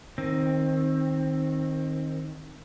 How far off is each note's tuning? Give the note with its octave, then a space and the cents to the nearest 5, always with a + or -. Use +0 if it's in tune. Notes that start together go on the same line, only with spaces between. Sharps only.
D#3 +0 C4 +20